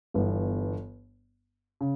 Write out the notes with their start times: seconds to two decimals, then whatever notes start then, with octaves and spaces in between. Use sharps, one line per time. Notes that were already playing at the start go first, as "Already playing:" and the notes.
0.14 G1 G2 E3 B3
1.81 C#3